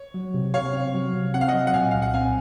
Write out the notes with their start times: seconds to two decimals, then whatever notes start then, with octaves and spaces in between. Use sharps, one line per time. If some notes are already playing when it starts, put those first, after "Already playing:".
Already playing: C#5
0.14 F#3
0.34 C3
0.54 C3 C#5 F5
0.74 C4
0.94 F#3
1.13 C3
1.34 C4 F#5
1.41 F5
1.48 D#5 F#5
1.54 F#3
1.67 F#5
1.73 A#2 F5 G#5
1.91 C2 F5
2.02 F#5
2.14 C4 F5 G#5